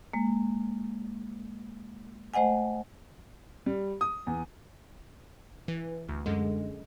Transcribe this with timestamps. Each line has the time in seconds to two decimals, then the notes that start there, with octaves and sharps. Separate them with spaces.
0.13 G#3 A#3
2.34 A3 C5 D#5 F#5 G#5
3.66 G3
4.01 D#6
4.27 E2
5.68 E3
6.09 D2
6.26 F#2 D3 G#3